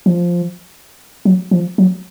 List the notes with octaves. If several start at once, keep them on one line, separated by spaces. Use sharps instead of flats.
F3
F#3
F3
F#3